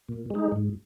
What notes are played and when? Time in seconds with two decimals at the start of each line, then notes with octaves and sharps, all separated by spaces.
0.09 A#2
0.30 G#3 D#4
0.52 G#2